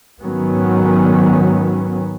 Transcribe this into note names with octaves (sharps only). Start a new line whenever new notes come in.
G#2 D#3 F#3 B3 C#4